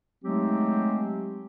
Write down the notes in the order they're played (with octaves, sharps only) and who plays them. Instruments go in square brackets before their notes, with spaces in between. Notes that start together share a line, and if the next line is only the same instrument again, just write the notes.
[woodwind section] F#3 G#3 A3 C4 D#4 G4